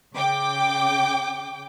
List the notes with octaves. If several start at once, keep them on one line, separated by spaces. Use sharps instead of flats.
C#3 G5 D6